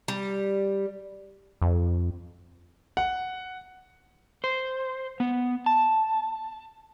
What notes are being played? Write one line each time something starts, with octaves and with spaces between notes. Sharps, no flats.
G3
F2
F#5
C5
B3
A5